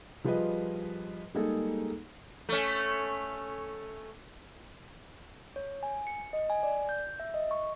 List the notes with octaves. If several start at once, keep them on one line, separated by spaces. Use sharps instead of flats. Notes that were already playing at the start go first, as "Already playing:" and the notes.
F3 G3 F4 G#4 B4 D#5
G3 G#3 A#3 D#4 G#4 A4
A3 C#4
C#5
G#5
C#7
D#5
G#5
D5
G6
E5
D#5
C#6